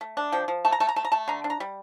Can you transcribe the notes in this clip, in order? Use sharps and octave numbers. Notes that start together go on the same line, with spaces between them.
A3
D4
F3 G5
F3
A3 A5
A#5
A3 A5
A#5
A3 A5
A#5
A3 A5
D3 A#5
D4
A#5
G3